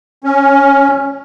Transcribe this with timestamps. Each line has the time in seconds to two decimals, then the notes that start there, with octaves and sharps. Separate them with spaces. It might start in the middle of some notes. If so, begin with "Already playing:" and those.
0.24 C#4